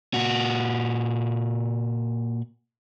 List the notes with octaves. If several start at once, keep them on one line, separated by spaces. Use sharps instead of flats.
A#2 F#4